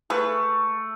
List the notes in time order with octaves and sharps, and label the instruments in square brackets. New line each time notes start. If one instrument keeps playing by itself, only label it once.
[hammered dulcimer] A3 [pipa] G#4 B4